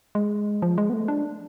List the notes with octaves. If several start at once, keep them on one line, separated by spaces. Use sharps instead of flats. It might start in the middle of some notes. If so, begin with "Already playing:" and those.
G#3
F3
G#3
B3
A3
D4